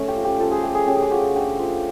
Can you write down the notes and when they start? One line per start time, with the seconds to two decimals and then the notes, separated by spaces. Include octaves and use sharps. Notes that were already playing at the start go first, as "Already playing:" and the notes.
Already playing: A3 C#4
0.08 G4
0.16 F3
0.25 G4
0.39 F3 A4
0.51 G#4
0.63 A3 G4
0.75 G#4
0.87 C#4 G4
0.96 G#4
1.02 G4
1.11 F3 F#4
1.36 D3 G4
1.59 F3